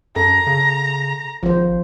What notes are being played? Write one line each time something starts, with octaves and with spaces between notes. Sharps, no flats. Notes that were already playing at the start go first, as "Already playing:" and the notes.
F#2 A4 A#5
C#3
G#1 F3 C5